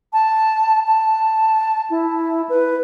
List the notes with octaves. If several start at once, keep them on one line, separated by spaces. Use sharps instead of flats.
A5
A5
E4
B4